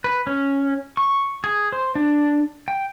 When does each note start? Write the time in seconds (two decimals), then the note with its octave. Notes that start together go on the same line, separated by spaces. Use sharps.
0.04 B4
0.27 C#4
0.97 C#6
1.44 G#4
1.72 C5
1.95 D4
2.68 G5